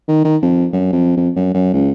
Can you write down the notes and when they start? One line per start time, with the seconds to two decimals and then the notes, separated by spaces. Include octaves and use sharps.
0.08 D#3
0.24 D#3
0.42 F2
0.73 F#2
0.93 F2
1.17 F2
1.36 F#2
1.54 F#2
1.74 C#2